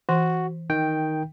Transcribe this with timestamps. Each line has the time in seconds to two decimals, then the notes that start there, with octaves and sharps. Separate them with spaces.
0.09 E3 F#4
0.70 D#3 G5